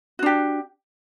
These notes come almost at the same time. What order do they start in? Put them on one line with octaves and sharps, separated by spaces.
F#4 D4 G4